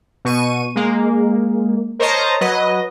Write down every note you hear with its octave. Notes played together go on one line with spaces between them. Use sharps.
B2 C#6 D#7
G#3 A#3
A#4 C5 C#5 D#5 A5 A#5
F#3 B4 D#5